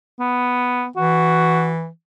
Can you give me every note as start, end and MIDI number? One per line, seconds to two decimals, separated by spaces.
0.19 0.85 59
0.96 1.88 52
0.96 1.70 66